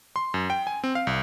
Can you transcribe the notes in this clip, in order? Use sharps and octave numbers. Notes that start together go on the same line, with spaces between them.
C6
F#2
G5
G#5
C4
F5
C2